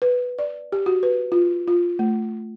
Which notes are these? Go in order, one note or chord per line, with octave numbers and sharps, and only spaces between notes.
B4
D5
G4
F#4
B4
F4
F4
A3